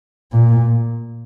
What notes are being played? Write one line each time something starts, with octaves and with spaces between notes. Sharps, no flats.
A#2